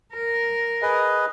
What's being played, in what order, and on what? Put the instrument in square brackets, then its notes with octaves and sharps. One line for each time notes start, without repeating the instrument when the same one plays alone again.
[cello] A#4
[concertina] G#4 B4 D#5